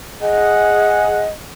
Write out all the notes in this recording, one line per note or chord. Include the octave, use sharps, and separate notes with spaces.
G#4 D#5 F#5